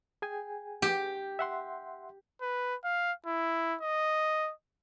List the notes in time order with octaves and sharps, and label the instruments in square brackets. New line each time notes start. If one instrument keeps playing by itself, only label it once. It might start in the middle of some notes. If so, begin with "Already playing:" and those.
[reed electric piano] G#4 G5 G#5
[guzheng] G4
[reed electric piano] E5 F#5 C6
[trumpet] B4
F5
E4
D#5